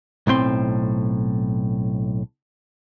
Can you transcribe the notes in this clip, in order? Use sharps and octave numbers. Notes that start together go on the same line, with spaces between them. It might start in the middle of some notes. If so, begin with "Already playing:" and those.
B1 A2 C4 C6